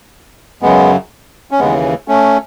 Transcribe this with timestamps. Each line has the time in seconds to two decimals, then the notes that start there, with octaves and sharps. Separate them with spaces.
0.62 F#2 C#3 F#3 G#3 B3
1.51 C#4
1.59 D#2 C#3 E3 G#3 B3
2.08 A3 C#4